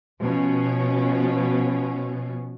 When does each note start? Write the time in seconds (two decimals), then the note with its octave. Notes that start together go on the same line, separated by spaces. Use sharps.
0.22 B2 F3 C#4